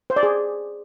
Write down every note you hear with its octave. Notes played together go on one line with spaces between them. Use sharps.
C5
D5
G#4